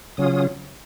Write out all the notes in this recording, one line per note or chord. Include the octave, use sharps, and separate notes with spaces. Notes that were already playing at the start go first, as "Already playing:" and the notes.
C#3 F#3 C#4 F4 D#6